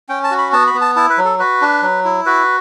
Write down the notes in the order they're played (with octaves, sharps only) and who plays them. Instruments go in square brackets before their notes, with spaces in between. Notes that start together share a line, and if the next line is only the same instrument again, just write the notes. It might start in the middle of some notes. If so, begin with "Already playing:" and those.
[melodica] C#4 G5
A5
F#4
B5
B3 A5
B5
B3
A5
E4 A5
B4
F#3
A4
F#4 B4
D4
F#3
E4
F#4 B4